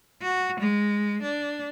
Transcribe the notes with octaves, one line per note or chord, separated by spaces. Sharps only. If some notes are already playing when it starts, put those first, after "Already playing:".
F#4
G#3
D4